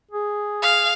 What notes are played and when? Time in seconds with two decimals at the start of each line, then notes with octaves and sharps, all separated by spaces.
0.11 G#4
0.62 F5